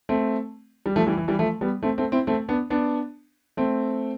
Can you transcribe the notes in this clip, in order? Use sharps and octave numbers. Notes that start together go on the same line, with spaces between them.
A3 C4
G3
F3 A3
E3 G3
E3
E3 G3
F3 A3
G3 B3
A3 C4
A3 C4
C4 E4
A3 C4
B3 D4
B3 D4
A3 C4